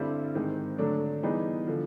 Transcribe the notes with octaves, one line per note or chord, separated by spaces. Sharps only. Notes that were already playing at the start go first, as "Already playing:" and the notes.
Already playing: G2 D3 G3 C4 E4
G#2 D#3 G#3 C4
D3 F#3 A3 D4
E3 G3 B3 D#4 G#4
D3 F3